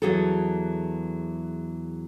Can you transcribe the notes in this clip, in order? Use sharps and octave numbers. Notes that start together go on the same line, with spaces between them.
E2 E3 F#3 G#4 A4